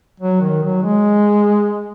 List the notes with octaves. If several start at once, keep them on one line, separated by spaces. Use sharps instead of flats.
F#3
D#3
F#3
G#3